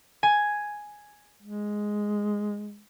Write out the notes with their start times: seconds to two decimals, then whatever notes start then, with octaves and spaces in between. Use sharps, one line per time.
0.23 G#5
1.42 G#3